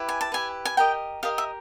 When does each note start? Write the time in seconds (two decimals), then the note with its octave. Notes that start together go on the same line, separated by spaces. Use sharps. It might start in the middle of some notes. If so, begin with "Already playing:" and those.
Already playing: E4 G4 B4
0.09 G#5
0.21 A5
0.32 E4 G4 B4 G#5
0.65 G#5
0.77 G4 A#4 D#5 G5
1.23 G4 A#4 D#5 F5
1.38 E5